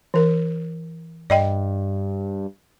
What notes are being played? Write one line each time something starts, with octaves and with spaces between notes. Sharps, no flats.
E3 A#4
G2 D5 D#5 G5